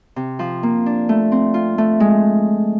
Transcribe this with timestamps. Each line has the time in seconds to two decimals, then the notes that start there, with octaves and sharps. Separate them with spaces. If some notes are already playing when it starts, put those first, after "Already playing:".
0.16 C3
0.39 F3
0.63 A#3
0.86 D4
1.09 A3
1.32 C4
1.54 F4
1.78 A3
2.00 G#3